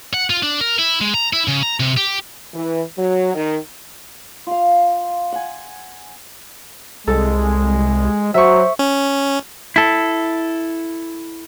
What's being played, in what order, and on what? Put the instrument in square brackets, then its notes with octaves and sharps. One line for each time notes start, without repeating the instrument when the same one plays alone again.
[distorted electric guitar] F#5
F4
D4
A#4
E4
G#3
A#5
E4
C#3
A#5
C3
G4
[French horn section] E3
F#3
D#3
[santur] F4 F5
F#5 G#5
[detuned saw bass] C2 [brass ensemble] G#3 [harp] A4
[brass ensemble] F#3 [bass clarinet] C5 [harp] E5 C#6
[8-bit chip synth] C#4
[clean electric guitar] E4 A4